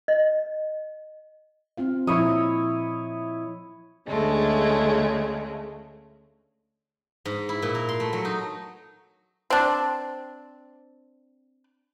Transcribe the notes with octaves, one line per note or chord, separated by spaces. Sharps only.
D#5
C4 F4 F5
A#2 F3 E4 C#5 D#5
D2 C#3 G#3 A3
G#2
E4
A#2
A#4
C6
A3
F#3
D#4
C4 D4